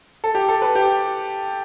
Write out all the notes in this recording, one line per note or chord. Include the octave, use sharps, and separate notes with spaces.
A4
G4
A4
B4
G4